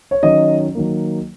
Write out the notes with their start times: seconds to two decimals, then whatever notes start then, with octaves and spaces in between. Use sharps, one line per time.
0.11 C#5
0.23 D#3 F#3 C#4 D#5
0.75 D#3 F#3 A#3